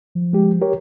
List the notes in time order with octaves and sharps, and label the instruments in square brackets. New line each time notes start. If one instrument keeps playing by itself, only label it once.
[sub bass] F3
[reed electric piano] G#3 G4
G4 A#4 C#5